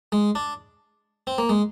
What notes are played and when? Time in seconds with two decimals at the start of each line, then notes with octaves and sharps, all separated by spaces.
0.12 G#3
0.35 D4
1.27 C4
1.38 A#3
1.49 G#3